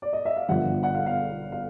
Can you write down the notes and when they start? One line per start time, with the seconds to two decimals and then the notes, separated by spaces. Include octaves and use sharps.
0.02 D5
0.13 D#5
0.25 E5
0.36 F5
0.49 G1 G2 D3 F3 F#5
0.83 F#5
0.95 F5
1.06 F5
1.52 F5